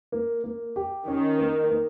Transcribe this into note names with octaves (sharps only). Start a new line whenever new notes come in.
A#3
A#3
G4
D#3 C#4
A#3
A#3